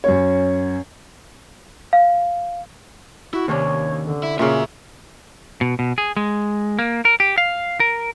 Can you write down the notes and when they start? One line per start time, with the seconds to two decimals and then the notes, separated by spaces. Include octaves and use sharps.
0.04 F#2 C#4 C#5
1.93 F5
3.33 E4 F#4
3.48 D#2 C3 C#4 D4 C#5
4.04 D3
4.23 E4
4.39 A#2 C#3 C#4 F#4 E5
5.61 B2
5.79 B2
5.98 G#4
6.17 G#3
6.79 A#3
7.05 A#4
7.20 G4
7.38 F5
7.80 A#4